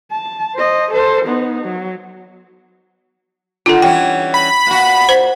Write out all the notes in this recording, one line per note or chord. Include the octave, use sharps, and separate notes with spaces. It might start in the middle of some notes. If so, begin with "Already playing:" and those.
A5
C5 D#5
A4 C5
B3 D#4
F#3
D3 D#3 F4 A4
E3 G3 C#4 G5
B5
A#2 F#4
C5